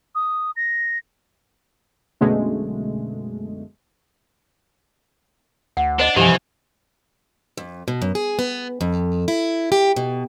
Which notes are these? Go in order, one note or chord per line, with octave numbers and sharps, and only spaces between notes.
D#6
A#6
B1 F#2 B2 D3 G#3 A3
D2 F#5
D4 C5 D#5
C2 G2 E3 F3 G4 G#5
F2
B2
F#2
G#4
B3
F2
E4
G4
B2